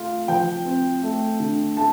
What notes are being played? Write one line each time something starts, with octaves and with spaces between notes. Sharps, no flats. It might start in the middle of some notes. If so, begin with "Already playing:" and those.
Already playing: A3 F4
F3 G5
C4
A3
D3
A3 A5